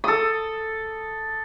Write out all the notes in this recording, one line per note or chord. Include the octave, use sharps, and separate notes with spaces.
A4 D#6